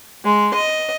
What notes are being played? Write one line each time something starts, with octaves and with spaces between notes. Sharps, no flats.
G#3
D#5